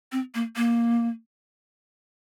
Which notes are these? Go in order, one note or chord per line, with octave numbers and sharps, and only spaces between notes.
C4
A#3
A#3